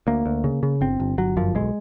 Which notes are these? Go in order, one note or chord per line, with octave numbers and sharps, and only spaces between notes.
D2 A#3
D2
C#3
C#3
G1 C4
G1
G1 F#3
F#2 F3
B1 G#3